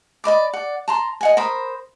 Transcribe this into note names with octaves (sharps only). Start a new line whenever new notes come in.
D5 D#5 B5 D6
D5 F#5
A5 A#5 C6
D#5 F#5 G#5
A#4 C5 B5 D#6